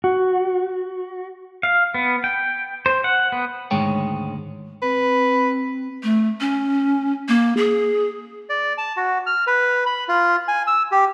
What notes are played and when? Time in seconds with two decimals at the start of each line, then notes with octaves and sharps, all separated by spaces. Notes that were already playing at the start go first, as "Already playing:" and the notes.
0.04 F#4
1.63 F5
1.94 B3
2.24 G5
2.86 C5
3.04 F#5
3.32 B3
3.71 D2 G#2 D#3 G#3 C#5 G5
4.82 C4 B4
6.03 A3
6.41 C#4
7.28 A#3
7.57 G#4
8.49 D5
8.78 A5
8.97 F#4
9.26 F6
9.47 B4
9.86 B5
10.08 F4
10.48 G#5
10.67 E6
10.91 G4